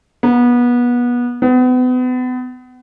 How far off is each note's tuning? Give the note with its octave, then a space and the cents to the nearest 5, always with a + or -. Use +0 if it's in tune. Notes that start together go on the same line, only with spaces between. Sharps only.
B3 -25
B3 +35